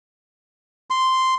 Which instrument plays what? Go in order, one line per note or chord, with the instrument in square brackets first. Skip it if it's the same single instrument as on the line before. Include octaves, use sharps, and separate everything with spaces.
[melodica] C6